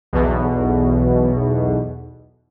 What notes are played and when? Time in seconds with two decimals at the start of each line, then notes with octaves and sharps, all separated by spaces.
0.13 B1 E2 B2